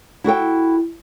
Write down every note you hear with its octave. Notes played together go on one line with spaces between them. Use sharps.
E4 F#4 A4 G5